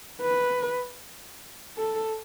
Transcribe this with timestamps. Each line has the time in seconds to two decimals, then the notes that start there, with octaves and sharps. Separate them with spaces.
0.21 B4
1.77 A4